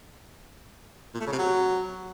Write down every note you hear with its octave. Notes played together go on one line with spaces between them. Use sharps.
A#2
A3
C#3
C3
F#3